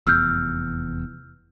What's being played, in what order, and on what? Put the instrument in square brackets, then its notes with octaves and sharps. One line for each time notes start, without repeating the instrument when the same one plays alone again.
[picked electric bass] F1 E2 [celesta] E6 F6 G6